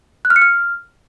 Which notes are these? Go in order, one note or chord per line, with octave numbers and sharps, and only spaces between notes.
F#6
F6
C#7
F6